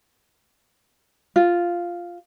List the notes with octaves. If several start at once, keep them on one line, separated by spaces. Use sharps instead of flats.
F4